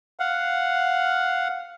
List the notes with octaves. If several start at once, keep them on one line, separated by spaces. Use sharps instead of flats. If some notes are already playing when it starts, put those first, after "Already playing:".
F5 F#5